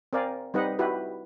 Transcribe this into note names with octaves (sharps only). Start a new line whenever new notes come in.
C4 A#4 D5 F5 G#5
G3 C4 D#4 B4 D#5 F#5
E4 F#4 G4 B4